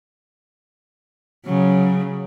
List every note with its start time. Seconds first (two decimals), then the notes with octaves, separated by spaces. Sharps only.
1.45 C#3 F#3